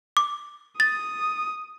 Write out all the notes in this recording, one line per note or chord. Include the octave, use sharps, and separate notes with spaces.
D6
D#6 A6